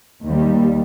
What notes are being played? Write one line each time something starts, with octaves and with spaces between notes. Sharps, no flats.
D#2 G3